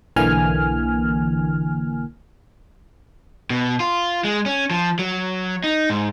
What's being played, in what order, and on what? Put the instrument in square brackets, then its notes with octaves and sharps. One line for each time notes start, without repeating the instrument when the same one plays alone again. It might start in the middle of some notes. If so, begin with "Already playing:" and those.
[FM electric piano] B1 D3 E3 A#3 G#5 F6
[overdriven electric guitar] B2
F4
G#3
C#4
F3
F#3
D#4
G#2